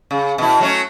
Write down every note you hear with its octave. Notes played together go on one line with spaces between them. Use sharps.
C#3
B2 E4
F#3 A3 C#4